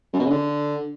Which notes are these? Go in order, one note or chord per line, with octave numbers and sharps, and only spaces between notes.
F#2
B2
C#3
D3